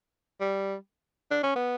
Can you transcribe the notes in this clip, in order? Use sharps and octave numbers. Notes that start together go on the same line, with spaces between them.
G3
D4
C#4
B3